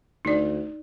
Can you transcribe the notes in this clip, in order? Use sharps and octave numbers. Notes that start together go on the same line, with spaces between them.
D2 D#4 D5